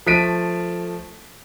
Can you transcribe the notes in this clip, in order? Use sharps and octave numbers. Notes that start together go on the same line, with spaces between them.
F3 A3 B6 D7 D#7